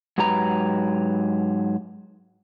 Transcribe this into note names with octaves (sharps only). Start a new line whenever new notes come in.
G#2 F#3 G4 B4 A#5